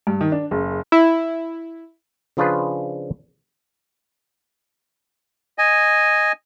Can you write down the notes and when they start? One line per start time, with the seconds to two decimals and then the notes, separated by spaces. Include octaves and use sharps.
0.07 G2
0.21 D#3
0.32 D4
0.51 F#1
0.92 E4
2.37 C#3 F3 D4 F4 G#4 B4
5.58 D#5 G#5